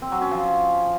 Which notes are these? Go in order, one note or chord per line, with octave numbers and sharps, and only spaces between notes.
C4
F#3
C#4
F3